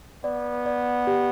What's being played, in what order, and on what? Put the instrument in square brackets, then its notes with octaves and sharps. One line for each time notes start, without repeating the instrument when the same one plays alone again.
[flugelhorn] B3 [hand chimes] D5
[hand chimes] D5
G4